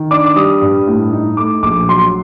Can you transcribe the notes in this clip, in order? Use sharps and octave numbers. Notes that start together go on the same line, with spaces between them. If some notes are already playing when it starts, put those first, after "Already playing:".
Already playing: D#3
D4 D6
D6
G3 D#6
G2
A2
D#4
A3 D6
A#1 D6
F#3 C6